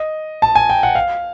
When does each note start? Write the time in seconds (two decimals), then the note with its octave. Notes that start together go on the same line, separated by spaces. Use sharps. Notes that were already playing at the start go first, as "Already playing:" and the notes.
Already playing: D#5
0.42 A5
0.55 G#5
0.70 G5
0.83 F#5
0.95 F5